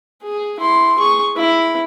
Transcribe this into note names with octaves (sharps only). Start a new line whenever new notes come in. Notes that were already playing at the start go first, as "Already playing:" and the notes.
G#4
E4 C6
G#4 C#6
E4 B5